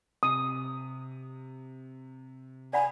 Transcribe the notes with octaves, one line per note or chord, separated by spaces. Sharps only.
C3 D#6
D5 F#5 G#5 B5